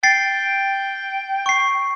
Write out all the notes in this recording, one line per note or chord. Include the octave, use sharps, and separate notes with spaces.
G5 A6 C7
C#6 C7